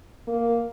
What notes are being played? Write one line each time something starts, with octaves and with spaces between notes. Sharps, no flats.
A#3